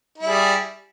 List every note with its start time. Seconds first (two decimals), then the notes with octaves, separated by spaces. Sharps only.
0.18 E4
0.23 G3
0.28 G#4